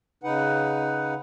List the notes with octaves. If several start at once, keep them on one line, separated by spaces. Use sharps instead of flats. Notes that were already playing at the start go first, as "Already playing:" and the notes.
C#3 D#4 B4 F#5